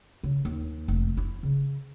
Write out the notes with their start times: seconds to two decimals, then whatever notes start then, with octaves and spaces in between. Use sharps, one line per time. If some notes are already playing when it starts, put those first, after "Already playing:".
0.23 C#3
0.45 D#2
0.88 F1
1.17 E4
1.43 C#3